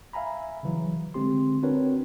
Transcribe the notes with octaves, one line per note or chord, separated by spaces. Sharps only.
E5 F5 G#5 A#5 B5
C#3 E3 F#3
D3 G#3 C4 G4 C6
C4 D4 F#4 A#4 B4 C#5